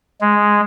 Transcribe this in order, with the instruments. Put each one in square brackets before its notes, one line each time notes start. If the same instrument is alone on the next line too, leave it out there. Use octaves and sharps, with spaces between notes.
[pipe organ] G#3